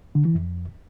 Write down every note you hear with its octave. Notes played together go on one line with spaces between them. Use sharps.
D3
E3
F2